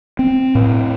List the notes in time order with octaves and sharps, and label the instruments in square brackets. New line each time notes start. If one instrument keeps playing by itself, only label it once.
[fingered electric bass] C4
A2